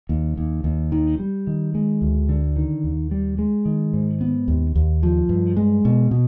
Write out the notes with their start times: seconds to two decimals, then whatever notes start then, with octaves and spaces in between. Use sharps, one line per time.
0.09 D#2
0.37 D#2
0.64 D#2
0.92 D#3
1.19 G3
1.47 D#3
1.75 G#3
2.02 D2
2.29 D3
2.56 D#3
2.84 D#2
3.11 G3
3.39 G#3
3.65 D#3
3.93 G#2
4.21 B3
4.48 D#2
4.76 D#2
5.03 F3
5.29 G2
5.57 G#3
5.85 B2
6.11 B2